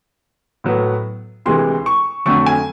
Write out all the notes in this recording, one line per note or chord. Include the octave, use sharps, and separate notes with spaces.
A2 F#3 B3
D2 C3 E3 G#3 C6
C#6
F2 D3 F#3 A3 C#6
G#5